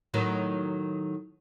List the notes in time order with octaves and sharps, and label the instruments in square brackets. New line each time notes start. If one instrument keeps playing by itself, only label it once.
[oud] A2 D#3 F#3